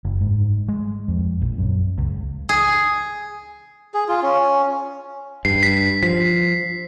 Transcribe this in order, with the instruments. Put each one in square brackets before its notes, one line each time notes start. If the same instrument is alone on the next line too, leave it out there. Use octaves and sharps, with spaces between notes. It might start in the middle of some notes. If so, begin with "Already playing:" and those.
[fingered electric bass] F#1
G#2
G#3
F2
A#1
F#2
C#2
[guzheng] G#4
[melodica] G#4
F4
C#4
[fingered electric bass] G2 [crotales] C7
[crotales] B6
[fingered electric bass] F3 [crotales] B6